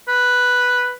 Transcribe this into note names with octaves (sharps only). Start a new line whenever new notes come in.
B4